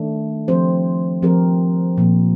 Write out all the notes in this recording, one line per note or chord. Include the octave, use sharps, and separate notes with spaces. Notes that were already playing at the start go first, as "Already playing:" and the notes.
Already playing: D#3 A3 D4
F3 C4 G4 C5
F3 C4 G4 A#4
A#2 F3 A#3